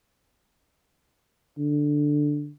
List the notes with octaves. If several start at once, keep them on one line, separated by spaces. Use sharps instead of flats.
D3